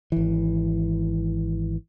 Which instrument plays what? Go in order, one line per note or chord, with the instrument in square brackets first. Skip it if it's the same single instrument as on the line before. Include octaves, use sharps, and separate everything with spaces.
[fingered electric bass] G#1 E3